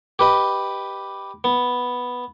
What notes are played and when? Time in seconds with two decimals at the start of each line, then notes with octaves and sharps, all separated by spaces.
0.19 G4 B4 D#5
1.44 B3